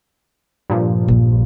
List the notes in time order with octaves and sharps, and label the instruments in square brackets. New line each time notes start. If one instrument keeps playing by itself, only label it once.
[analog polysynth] G2 A#2 F3
[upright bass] A#1